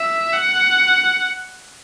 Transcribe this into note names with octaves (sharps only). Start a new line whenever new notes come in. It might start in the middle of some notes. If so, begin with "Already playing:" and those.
Already playing: E5
F#5